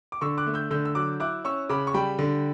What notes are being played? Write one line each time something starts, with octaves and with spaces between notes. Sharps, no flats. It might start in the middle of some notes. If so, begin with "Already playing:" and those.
D6
D3 C#6 E6
D6 F#6
A3
E6 G6
D3 E6 G6
E6
F#3 D6 F#6
E4 D6 F#6
C#4 C#6 E6
C#3 B5 D6
C#6
G3 G5 B5
D3